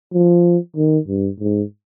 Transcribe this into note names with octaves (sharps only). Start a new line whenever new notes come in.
F3
D#3
G2
G#2